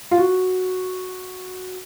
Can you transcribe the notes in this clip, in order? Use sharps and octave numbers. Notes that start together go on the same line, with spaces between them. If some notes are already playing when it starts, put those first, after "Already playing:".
F4
F#4